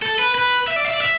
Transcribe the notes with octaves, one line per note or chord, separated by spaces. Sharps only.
A4
B4
B4
E5
D5
E5
D5
E5